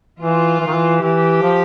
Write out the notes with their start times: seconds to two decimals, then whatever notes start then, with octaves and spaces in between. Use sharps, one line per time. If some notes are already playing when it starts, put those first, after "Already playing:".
0.20 E3 F4
0.60 E3
0.67 D#3
0.75 E3
1.01 E3 G4
1.42 F3